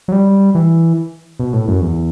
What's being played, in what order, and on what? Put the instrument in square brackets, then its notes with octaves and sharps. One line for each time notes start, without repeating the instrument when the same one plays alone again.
[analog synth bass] F#3
G3
E3
B2
A2
F#2
E2